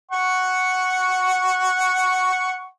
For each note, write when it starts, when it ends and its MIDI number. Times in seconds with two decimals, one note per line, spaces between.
0.11 2.66 78
0.11 2.66 85